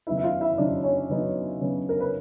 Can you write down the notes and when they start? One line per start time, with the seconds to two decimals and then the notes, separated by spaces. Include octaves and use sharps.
0.07 C#3 F#3 B3 D#4 E4 E5
0.17 E5
0.24 F4 F5
0.41 E4 E5
0.58 C#3 F#3 B3 D4 D#4 D5
0.83 C#4 C#5
1.09 C#3 F#3 B3 D#4
1.61 C#3 F#3 B3 D#4
1.89 A#4
2.00 B4